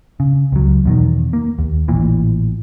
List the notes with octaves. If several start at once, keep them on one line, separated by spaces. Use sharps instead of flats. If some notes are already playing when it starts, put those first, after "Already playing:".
C#3
C#2 F#3
E2 B2 D#3
A#3
D#2
A1 A#2 E3